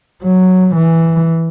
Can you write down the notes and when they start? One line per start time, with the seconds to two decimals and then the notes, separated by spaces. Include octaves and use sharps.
0.23 F#3
0.75 E3